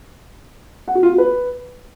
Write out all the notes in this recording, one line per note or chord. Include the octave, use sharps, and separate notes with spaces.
F#5
F#4
F4
F#4
B4